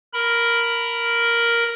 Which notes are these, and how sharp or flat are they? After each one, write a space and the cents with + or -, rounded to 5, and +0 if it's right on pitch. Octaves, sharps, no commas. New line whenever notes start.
A#4 +0 B5 +0